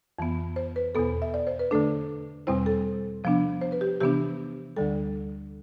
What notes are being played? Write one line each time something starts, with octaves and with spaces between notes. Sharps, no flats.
F2 E3 B3
C5
B4
E2 B2 B3 A4
E5
D5
C5
B4
D3 A3 D4 A4
E2 B2 G3 C4 E4 C5
A4
C3 F3 B3 D4
C5
B4
G4
C3 E3 B3 D4 G4
D2 D3 G3 A4